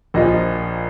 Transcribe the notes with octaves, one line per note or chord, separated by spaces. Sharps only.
A#1 A#2 F3 D#5